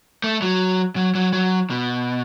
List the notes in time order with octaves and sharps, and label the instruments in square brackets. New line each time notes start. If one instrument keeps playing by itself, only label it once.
[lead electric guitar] A3
F#3
F#3
F#3
F#3
B2